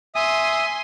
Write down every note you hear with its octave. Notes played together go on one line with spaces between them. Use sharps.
E5 G#5 C6 D#6